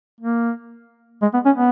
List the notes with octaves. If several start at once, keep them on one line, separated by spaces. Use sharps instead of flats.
A#3
G#3
B3
C#4
B3